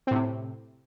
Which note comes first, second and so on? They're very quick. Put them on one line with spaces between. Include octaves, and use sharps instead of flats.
C4 A2 C3